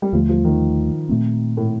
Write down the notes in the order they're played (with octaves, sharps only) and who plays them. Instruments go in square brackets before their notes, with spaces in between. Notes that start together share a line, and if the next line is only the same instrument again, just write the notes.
[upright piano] G3
[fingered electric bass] D#2 D3 A3 [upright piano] F3
[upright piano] F3
D#3
[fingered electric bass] A#2 A3 C4
[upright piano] A2